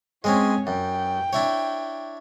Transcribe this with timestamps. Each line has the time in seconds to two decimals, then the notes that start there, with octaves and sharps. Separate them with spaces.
0.24 G#3 C4 C#4 C#5 G#5
0.67 F#2 G5
1.33 D4 E4 C#5